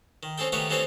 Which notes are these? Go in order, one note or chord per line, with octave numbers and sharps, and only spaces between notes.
D#3
C4 C#4 G#4 A4 G5
D#3 A3 B3 G4 G#4 C#5
E3 G3 C4 G#4 A4 C#5